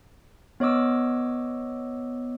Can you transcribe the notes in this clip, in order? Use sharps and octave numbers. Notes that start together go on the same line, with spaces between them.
B3 C#5 D#5 D6 E6